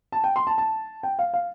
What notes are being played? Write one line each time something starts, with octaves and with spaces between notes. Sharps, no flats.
A5
G5
C6
A5
A5
G5
F5
F5